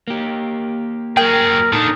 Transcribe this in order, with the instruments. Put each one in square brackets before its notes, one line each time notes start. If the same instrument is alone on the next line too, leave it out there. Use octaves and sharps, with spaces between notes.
[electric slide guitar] A#3 G4
[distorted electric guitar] F#3 G#4 [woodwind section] A#4 [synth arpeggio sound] G5
[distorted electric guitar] A#2 D4 [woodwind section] D#4 [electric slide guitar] A4